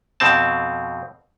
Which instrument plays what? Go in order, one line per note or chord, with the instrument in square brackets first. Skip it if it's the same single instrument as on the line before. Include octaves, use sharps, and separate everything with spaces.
[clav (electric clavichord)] F2 B2 C4 A5